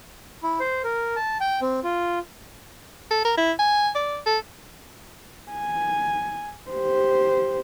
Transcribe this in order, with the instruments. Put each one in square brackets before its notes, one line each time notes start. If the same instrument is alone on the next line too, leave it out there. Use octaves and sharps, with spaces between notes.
[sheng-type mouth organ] E4
C5
A#4
A5
G5
C4
F4
[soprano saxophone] A4
A#4
E4
G#5
D5
A4
[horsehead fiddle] G#5
G4 C5